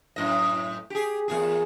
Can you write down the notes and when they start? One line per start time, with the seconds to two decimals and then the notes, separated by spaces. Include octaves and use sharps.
0.16 F#2 A2 D#5
0.90 G4 G#4
1.28 E2 A#2 G#4